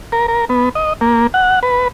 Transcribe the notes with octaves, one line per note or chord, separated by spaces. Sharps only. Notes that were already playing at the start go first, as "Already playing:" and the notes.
A#4
A#4
B3
D#5
A#3
F#5
B4